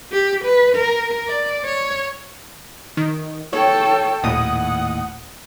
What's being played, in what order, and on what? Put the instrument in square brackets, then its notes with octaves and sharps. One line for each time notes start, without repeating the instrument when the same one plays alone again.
[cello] G4
B4
A#4
D5
C#5
[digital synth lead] D#3
[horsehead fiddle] A4 G5 [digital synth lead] C#5
[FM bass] D#1 [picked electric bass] D#2 A2 [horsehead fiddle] F#5 [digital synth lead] D#6